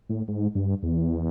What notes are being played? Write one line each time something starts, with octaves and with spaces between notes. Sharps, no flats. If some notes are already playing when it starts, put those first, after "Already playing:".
A2
G#2
G2
E2